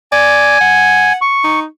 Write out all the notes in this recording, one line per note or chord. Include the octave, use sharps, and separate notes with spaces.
D5 G#5
F#5
C#6
D#4